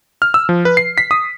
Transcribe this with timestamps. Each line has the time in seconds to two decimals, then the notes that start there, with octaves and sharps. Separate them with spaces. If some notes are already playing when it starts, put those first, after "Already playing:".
0.22 F6
0.34 E6
0.49 F3
0.65 B4
0.77 C7
0.98 B6
1.11 D#6